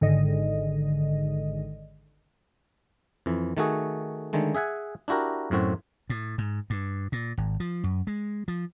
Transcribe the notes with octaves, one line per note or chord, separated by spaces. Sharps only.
G#1 G#2 D3 D#5
F2 E3
D#3 A3 F#4 G#4
D3 D#3 G#3 A3
G#4 E5 F#5 G#5
D4 E4 F#4 G4 A#4
F#2 A2 C4 F#4
A2
G#2
G2
A#2
G#1
F3
F#2
G#3
F3